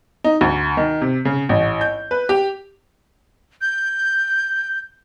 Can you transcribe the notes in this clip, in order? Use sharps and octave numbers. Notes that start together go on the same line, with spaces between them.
D#4
D2
D#3
C3
C#3
A1
G6
B4
G4
G6